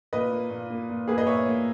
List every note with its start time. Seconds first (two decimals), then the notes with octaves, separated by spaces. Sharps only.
0.13 A#2 B4 D#5
0.32 A#3
0.50 A#2
0.70 A#3
0.90 A#2
1.08 A#3 G#4 B4
1.18 B4 D#5
1.27 A#2 C#5 E5
1.46 A#3